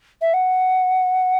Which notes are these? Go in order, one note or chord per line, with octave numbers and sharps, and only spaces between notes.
E5
F#5